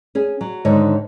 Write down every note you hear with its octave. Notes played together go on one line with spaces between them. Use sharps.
C#4 G#4
F#3
G#2 D3 D#3 D#4 C#5